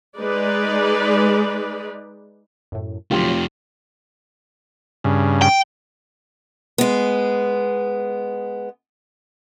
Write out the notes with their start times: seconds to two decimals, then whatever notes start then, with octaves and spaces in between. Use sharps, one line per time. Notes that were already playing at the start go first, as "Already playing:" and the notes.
0.16 G#3 D#4 B4 D5
2.72 F#2 A2
3.11 F2 B2 D3 F#3 A3 F4 G4 C6
5.04 G2 C#3
5.42 G5
6.78 G#3 B3